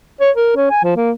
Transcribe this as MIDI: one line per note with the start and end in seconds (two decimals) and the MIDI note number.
0.21 0.31 73
0.36 0.52 70
0.56 0.70 61
0.71 0.81 80
0.84 0.95 53
0.96 1.12 58